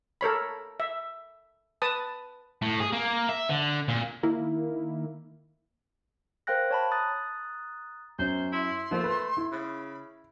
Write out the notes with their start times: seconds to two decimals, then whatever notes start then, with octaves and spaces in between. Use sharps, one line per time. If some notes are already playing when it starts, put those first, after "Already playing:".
0.21 A4 A#4 C#5 B5
0.80 E5
1.82 B4 A5 D#6
2.62 A2
2.80 G#4
2.92 A#3
3.29 E5
3.50 D3
3.88 A#2
4.23 D#3 A#3 E4
6.47 A#4 C5 F5 G5 F#6 A#6
6.71 C#5 A5 B5
6.91 A#5 D#6 F#6 A6
8.19 F#2 C#4 C5
8.52 E4 C6
8.91 F3 A3 A#3
9.04 B4
9.37 E4
9.52 C#3 B5